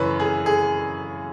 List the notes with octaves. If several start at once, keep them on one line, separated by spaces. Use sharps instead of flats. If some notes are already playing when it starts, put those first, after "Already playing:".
Already playing: F#2 C#3 E3 B4 C#5
G#4
G#4